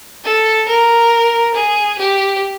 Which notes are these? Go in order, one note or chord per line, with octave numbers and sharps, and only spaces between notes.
A4
A#4
G#4
G4